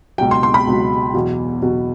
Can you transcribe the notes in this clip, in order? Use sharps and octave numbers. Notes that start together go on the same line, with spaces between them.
C#2 B2 F#3 G5
C6
C6
B5
C#2 B2 F#3
E2 B2 F#3
E2 B2 F#3